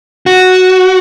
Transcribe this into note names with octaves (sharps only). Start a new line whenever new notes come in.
F#4